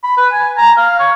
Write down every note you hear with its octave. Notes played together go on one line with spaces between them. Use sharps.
B5
B4
G#5
A#5
F5
C#5